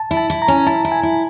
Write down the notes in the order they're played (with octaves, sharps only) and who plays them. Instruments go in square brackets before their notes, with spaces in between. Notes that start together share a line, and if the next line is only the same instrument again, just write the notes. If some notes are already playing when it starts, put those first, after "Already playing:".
Already playing: [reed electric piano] A5
[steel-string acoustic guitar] E4
[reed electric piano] A5
[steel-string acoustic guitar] E4
[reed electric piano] A#5
[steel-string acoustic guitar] C#4
[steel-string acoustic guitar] E4 [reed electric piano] A5
[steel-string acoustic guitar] E4
[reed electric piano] G#5
[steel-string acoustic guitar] E4